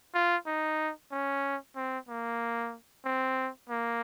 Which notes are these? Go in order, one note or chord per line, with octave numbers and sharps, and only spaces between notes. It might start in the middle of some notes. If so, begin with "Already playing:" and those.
F4
D#4
C#4
C4
A#3
C4
A#3